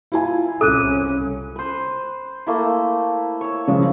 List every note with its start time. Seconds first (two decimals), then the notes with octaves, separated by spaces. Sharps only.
0.12 E4 F4 G#5
0.61 C2 C#4 A4 D6 F#6 D#7
1.56 B4 C5
2.47 A3 A#3 E4
3.41 C#5 E6
3.68 C#3 F3 G#3